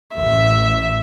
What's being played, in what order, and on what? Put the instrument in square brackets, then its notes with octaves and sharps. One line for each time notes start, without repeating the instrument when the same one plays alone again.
[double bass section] A1 [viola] E5